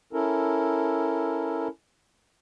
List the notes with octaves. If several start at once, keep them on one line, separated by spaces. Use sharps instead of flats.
C#4 E4 A4 A#4